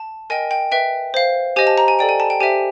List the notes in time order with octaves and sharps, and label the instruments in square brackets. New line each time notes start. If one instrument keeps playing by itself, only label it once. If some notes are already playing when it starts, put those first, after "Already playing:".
Already playing: [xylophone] A5
A#4 D#5 G5 G#5
G5
B4 E5 G5
C5 F5
G4 C5 D#5 G#5
A5
A#5
G#5
A4 D5 G5
G#5
A5
G5
G4 C5 E5 G5 G#5